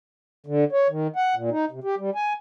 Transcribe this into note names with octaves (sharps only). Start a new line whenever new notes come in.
D3
C#5
D#3
F#5
A#2
D#4
C3
G4
G3
G#5